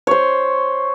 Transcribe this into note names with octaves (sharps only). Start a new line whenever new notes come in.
C5 C#5